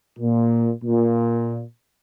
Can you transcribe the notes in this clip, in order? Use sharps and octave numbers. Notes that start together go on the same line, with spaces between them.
A#2
A#2